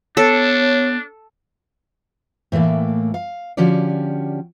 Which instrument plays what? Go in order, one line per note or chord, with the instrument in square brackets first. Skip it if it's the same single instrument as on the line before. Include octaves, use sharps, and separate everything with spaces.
[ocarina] B3 [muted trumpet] D4 [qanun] A4 [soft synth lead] C#5
[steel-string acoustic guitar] A2 E3 A3 A#3
F5
D3 F3 C#4 F#4 G4 D5